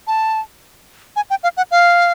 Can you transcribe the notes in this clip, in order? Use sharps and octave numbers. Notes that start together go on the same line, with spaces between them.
A5
G#5
G5
F5
F#5
F5